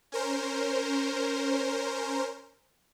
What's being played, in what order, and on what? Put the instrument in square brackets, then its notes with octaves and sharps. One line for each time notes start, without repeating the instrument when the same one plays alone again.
[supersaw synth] C#4 A#4 C5